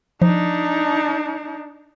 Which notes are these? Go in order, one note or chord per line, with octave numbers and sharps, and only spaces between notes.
F3 D4 D#4